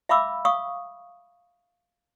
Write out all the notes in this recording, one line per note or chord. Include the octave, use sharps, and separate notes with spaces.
E5 F5 B5 D6 E6
F5 C#6 D#6